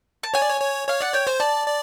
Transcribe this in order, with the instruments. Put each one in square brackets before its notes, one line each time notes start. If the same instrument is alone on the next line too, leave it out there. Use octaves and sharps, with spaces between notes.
[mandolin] A5
[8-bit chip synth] C#5 [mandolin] G#5
[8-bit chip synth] D5
C#5
C#5
[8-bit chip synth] C#5 [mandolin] F5
[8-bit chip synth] D5 [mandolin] F#5
[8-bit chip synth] C#5 [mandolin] G5
[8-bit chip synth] C5 [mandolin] G#5
[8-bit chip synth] D5 [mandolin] A5
[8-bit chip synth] D5